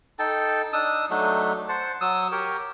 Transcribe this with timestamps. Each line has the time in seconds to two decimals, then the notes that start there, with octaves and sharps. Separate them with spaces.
0.19 D#4 A4 G5 A5
0.73 D4 D#4 D#6 E6
1.10 F#3 A3 D4 D#4
1.69 C5 F#5 A5
2.01 F#3 D#6 E6
2.32 G4 A#4 C#5